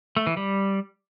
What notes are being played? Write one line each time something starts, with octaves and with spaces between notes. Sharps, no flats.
A3
E3
G3